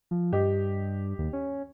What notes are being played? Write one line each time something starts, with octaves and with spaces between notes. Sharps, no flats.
F3
G2 G4 D#5
D#2
C#4